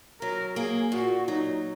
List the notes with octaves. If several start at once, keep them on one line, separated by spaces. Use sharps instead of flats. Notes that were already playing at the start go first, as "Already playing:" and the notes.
F#3 A#4
A#3 G#4
A#2 F#4
F#3 D#4